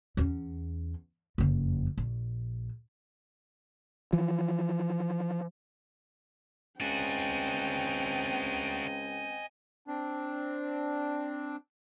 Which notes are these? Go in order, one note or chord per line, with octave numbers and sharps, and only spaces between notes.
E2 C#4
F#1 F2
A#1
E3 F3
C#2 C4 D4 F#4 D#5 G5 G#5
C4 D4